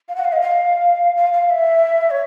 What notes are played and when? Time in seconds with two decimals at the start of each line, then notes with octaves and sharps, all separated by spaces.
0.08 F5
0.16 F#5
0.24 F5
0.32 D#5
0.41 F5
1.16 F5
1.33 F5
1.50 E5
2.10 C#5